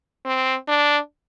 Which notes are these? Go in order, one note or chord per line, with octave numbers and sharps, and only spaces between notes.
C4
D4